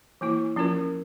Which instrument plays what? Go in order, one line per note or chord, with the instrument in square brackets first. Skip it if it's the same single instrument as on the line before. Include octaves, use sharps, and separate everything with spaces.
[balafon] E3 A#3 E4
F3 C#4 F4 A#4